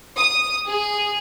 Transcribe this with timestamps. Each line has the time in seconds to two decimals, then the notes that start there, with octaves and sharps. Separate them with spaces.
0.17 D#6
0.66 G#4